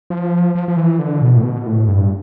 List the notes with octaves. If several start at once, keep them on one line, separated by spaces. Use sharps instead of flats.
F3
F3
F3
E3
D3
B2
A2
B2
A2
G2